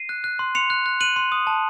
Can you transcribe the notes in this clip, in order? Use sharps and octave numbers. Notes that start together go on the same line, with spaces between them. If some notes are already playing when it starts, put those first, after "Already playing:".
Already playing: C7 D#7
F#6
F#6
C6
C6 C#7 F7
F#6
F#6
F#6 D#7 F#7
C6
D#6
A5